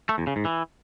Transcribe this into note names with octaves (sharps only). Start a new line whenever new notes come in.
A3
E2
C#3
G#2
E3